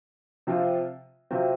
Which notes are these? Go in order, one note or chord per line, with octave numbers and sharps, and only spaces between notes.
C3 F3 C4 F4
C3 F#3 C4 F4